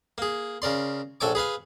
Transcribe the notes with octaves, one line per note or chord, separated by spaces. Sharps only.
A#3 G#4
C#3 A#4 D5 C6
A#1 A4 C#5 G#5 D6
G#4 B4 F5 G#5